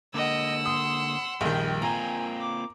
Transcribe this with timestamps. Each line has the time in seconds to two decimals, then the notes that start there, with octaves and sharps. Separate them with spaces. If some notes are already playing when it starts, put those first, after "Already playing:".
0.14 D3 A#3 D#5 F#5 E6
0.66 C6 D#6
1.41 A#1 F2 D#3 G3 G4 G5
1.82 A#3 C4 F4 G#5 A#5
2.40 D6